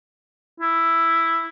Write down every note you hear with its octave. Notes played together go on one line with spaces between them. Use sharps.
E4